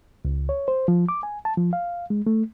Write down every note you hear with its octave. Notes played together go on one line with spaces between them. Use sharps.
C#2
C#5
C5
F3
D6
G#5
A5
F3
F5
G#3
A3